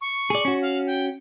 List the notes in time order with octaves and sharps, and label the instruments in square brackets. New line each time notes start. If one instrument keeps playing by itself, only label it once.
[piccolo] C#6
[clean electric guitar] G#4 D5
C#4 F#4
[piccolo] F5
G5